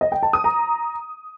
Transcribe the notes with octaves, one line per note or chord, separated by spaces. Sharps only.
D#5
G5
A5
D#6
A#5